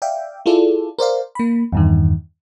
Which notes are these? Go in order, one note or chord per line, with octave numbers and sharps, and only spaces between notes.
D5 E5 F5 G5
E4 F4 G#4 A4 D5
A#4 C5 D5 F5
A#3 B5
E2 G2 D#3